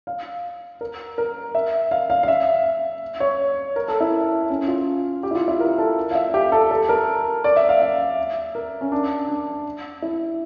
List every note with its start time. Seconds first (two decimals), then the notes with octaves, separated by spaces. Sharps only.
0.07 F5
0.81 A#4
1.18 A#4
1.55 E5
1.91 F5
2.10 F5
2.23 F5
2.28 E5
3.20 C#5
3.76 A#4
3.88 A4
4.01 E4
4.50 C#4
4.68 F4
5.23 G4
5.31 E4
5.35 F4
5.48 E4
5.60 A#4
5.78 A4
6.11 F5
6.15 E5
6.34 G4
6.52 A4
6.71 A4
6.89 A#4
7.44 D5
7.56 E5
7.69 F5
7.82 E5
8.55 A#4
8.81 C#4
8.92 D4
9.28 D4
10.02 E4